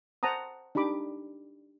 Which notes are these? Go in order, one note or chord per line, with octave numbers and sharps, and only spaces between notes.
C5 F#5 A5 A#5 D#6
D4 D#4 G4 B5 D6